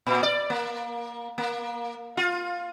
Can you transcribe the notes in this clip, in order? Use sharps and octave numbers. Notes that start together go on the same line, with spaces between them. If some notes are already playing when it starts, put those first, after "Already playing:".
A#2
D5
A#3
A#3
F4